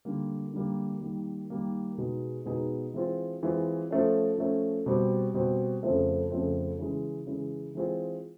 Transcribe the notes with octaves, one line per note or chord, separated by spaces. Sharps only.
D3 G3 A#3
D3 G3 A#3
D#3 G3 A#3
D#3 G3 A#3
B2 G#3 B3 D#4 G#4
B2 G#3 B3 D#4 G#4
E3 G#3 C4 F4
E3 G#3 C4 F4
F3 A3 C#4
F3 A3 C#4
B2 G3 C4
B2 G3 C4
F2 C#3 F3 A3 C4
F2 C#3 F3 A3 C4
C#3 E3 G#3
C#3 E3 G#3
E3 G#3 C4 F4 G#4